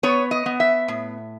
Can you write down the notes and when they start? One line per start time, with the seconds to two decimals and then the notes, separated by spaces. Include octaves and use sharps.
0.03 B3 C#5
0.31 D#5
0.46 B3
0.60 E5
0.88 A2